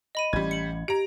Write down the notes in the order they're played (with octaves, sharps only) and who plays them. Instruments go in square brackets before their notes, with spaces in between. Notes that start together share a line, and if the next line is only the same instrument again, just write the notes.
[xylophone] D#5 B5 D#7
[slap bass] A1 E3 C#4 [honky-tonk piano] G3 G#6
[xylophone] C#7 F#7
[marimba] G4 [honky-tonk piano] A#5 D7